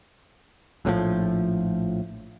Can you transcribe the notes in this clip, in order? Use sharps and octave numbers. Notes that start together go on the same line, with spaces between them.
A#1 A2 C3 F3